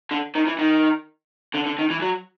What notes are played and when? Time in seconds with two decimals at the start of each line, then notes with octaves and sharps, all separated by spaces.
0.11 D3
0.35 D#3
0.47 E3
0.59 D#3
1.54 D3
1.66 D3
1.78 D#3
1.90 E3
2.02 F#3